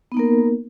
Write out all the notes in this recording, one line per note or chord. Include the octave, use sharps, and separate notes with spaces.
A#3 B3 D#4 A#4